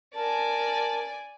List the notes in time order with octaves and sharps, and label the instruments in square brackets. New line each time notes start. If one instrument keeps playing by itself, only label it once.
[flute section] A#4 A5 [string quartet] D5 G#5